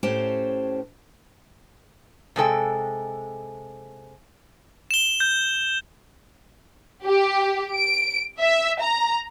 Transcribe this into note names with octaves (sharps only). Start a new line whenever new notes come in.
A2 C#4 G4 C5 A5
C3 G#3 A4 G5
E7 G7
G6
G4
D7
E5
A#5